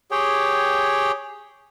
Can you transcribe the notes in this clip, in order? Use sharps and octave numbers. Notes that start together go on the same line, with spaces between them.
G4 G#4 C#5 G5